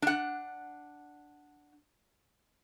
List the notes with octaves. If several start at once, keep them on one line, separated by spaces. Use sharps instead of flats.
D4 F#5